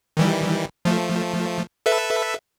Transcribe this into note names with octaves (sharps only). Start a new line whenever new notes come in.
D#3 E3 G3
F3 A3
A4 B4 E5